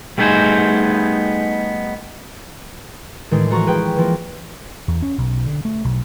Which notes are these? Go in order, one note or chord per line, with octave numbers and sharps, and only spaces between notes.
G3 A3 B3 D#4 G#4 C5
A2 D#3 E3 G#3 D4
A1 E3 F3 F#4 A#5 C#6
G#4 B4 G5
E3 F3 A#3
E2
C#4
B1
D3
A3
B1